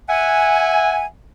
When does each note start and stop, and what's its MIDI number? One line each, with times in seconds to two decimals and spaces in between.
0.09 1.06 76
0.09 1.06 78
0.09 1.06 80